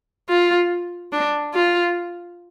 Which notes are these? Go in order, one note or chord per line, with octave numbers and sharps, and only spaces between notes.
F4
D4
F4